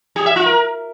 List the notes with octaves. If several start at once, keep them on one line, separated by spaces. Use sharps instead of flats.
G4
E5
F4
A#4